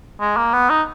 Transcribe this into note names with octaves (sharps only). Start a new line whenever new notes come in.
G#3
A#3
B3
D#4